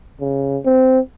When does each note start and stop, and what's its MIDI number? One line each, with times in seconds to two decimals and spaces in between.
0.20 0.58 49
0.65 0.99 60